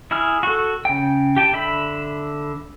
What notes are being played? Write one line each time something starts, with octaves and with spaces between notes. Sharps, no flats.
E4 G#4 F6
F#4 A4
C#3 G5
G4 G5 A5
D3 E5 B5